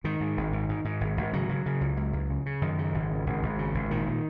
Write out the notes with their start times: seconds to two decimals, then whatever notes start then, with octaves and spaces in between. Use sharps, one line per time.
0.04 G#2 D#3
0.21 G#2
0.37 G#1
0.53 G#2
0.69 G#2
0.85 G#2
1.01 G#1
1.17 G#1
1.33 C#3 F#3
1.49 C#3
1.66 C#3
1.81 C#2
1.97 C#2
2.13 C#2
2.30 C#3
2.46 C#3
2.62 F#2 D#3
2.78 C#3
2.94 G#1
3.10 C#3
3.26 G#1
3.42 G#1
3.59 C#3
3.74 G#1
3.91 A#2 D#3
4.06 A#2